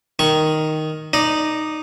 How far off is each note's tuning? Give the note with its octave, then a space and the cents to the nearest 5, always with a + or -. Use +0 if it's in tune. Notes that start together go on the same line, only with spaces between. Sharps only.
D#3 +0 C#6 +0
D#4 -5 D5 +5